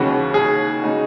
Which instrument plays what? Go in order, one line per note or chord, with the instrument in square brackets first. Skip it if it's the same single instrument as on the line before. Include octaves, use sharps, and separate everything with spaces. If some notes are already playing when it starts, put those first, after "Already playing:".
Already playing: [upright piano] D#2 C#3 E3 G#3 C#4 [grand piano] F#4
[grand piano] G#4
[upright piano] C#3 G#3 D#4 F#4